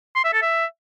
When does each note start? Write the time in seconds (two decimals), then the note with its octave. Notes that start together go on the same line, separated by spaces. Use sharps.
0.16 C6
0.24 E5
0.33 A4
0.42 E5